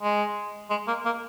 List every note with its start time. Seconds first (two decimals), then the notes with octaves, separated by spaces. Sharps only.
0.02 G#3
0.70 G#3
0.87 A#3
1.05 A#3